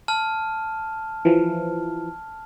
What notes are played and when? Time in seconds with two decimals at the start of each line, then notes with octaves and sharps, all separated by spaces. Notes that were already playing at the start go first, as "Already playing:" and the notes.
0.08 A5 F6
1.25 E3 F3